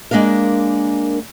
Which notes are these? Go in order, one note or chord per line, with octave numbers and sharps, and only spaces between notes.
G#3 A#3 D4 A#4 F5